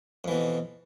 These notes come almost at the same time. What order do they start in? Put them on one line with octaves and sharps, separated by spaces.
F2 E3 B2